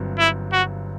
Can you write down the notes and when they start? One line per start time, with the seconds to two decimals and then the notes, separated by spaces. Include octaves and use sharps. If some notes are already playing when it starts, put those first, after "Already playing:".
Already playing: G1 G2 F#3 C4
0.19 E4
0.53 F#4